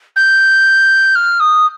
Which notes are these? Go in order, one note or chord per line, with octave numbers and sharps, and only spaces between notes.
G6
F6
D#6